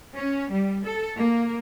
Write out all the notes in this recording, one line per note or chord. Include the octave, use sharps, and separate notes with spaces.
C#4
G3
A4
A#3